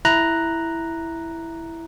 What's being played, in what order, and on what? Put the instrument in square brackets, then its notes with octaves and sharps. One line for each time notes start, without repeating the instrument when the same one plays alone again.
[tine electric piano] E4 A#5 F#6